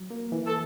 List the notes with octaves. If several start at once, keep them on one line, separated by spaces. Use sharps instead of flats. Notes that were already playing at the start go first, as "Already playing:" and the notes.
Already playing: F#3
A#3
E3
A4